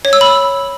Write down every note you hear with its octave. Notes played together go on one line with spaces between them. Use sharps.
C#5
E6
B5